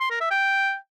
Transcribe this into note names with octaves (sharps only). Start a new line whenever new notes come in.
C6
A#4
E5
G5